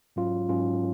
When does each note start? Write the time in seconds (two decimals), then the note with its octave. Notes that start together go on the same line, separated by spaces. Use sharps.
0.16 G#2 F#3 C#4 F4
0.49 G#2 F#3 C#4 F4